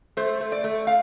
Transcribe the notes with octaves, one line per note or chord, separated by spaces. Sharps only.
A3 C5
A3
D5
A3
F5